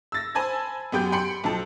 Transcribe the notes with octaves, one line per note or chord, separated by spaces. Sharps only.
E6 A6 A#6
C5 G#5 A5 B5 G#6
F#2 B3 G4 G5 G6
G5 B5 C6 C#7 D7 F#7
B1 F3 A5